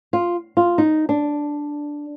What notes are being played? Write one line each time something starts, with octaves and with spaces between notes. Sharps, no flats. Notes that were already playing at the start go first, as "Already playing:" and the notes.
F4
F4
D#4
D4